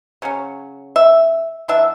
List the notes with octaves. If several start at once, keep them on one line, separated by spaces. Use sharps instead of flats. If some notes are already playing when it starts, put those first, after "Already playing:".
C#3 F#3 C#4
E5
E3 B3 D4 E5